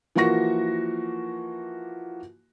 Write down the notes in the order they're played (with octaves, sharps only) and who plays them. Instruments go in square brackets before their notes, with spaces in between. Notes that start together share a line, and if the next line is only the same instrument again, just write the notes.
[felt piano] E3 F3 A#3 F#4 C#6 A#6